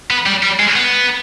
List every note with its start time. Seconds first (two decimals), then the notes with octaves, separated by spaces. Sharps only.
0.11 B3
0.26 G3
0.43 G3
0.60 G#3
0.75 B3